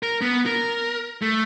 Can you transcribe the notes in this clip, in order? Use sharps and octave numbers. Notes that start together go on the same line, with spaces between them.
A#4
B3
A#4
A3